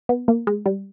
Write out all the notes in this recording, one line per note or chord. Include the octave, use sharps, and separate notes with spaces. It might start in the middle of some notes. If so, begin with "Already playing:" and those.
B3
A#3
G#3
G3